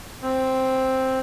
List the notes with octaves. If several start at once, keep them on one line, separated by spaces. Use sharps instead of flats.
C4